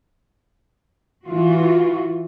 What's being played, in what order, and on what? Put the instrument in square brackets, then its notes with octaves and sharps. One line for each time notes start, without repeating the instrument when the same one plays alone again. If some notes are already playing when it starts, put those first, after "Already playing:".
[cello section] E3 F4 F#4